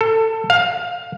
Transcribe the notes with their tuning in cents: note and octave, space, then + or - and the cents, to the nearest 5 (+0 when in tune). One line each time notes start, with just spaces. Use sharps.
A4 +20
F5 +20